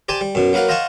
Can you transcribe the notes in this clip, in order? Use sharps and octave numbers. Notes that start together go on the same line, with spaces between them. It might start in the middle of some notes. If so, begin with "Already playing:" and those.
G4 C5 D5 G#5 A5
G3
F#2 B2
F#3 A#3 B4 F5 F#5
C5 D#5 F5 F#5 A5 C#6